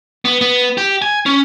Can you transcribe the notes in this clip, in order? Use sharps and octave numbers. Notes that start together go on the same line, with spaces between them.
B3
B3
G4
G#5
C#4